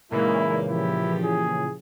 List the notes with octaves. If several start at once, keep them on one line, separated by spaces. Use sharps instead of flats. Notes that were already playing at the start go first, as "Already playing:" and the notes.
A#2 C#3 E3 G#3 A#3 D#4 E4
F3 E4 G4
G#4